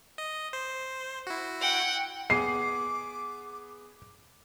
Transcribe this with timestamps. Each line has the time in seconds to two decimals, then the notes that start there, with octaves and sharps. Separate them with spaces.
0.18 D#5
0.53 C5
1.27 E4 F#4
1.61 F#5 G5
2.30 B3 G#4 D6 C7 D#7